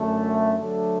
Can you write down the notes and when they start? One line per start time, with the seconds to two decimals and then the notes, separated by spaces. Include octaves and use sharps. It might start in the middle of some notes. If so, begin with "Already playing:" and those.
Already playing: F#2 D3 A3
0.59 D3 F#3 A3 D4 A4